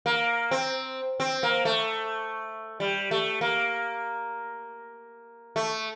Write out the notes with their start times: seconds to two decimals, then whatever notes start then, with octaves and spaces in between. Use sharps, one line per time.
0.06 A#3
0.51 C4
1.20 C4
1.43 A#3
1.65 A3
2.80 G3
3.11 A3
3.41 A#3
5.56 A3